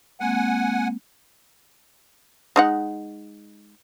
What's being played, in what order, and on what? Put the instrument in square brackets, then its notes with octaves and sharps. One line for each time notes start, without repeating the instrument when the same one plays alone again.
[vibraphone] G#3 A#3 C4 [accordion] F#5 G#5
[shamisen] G#3 D#4 F#5